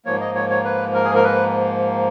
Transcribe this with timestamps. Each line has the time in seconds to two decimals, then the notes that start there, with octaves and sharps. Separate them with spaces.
0.05 G#2 F3 A#3 C#5
0.21 D#5
0.35 C#5
0.50 C#5
0.64 B4
0.94 A#4
1.04 G#4
1.15 A#4
1.24 B4